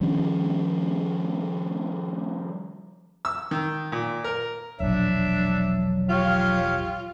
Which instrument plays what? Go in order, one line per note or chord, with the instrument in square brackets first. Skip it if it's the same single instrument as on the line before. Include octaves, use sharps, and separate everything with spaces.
[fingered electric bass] D#3 F3 G3 C#4
[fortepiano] E6
D#3
A#2
A#4
[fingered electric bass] E1 A#1 [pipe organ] F#3 [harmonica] D4 E5
[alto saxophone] F4 [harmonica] G4 C#5 F5